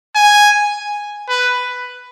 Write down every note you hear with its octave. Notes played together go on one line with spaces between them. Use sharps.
G#5
B4